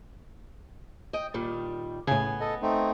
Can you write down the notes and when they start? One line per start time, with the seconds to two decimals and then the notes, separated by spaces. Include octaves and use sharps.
1.13 D#5 G5
1.34 A#2 D#3 G3
2.07 A2 C#3 B3 G#5
2.40 A4 D#5
2.62 A3 C4 D#4